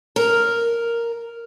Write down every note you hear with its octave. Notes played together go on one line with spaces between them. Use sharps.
A#4